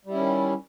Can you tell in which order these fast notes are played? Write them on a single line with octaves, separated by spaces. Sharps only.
G3 E4 C#4 D#3